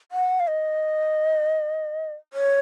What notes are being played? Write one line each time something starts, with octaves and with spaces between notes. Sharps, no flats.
F#5
F5
D#5
C#5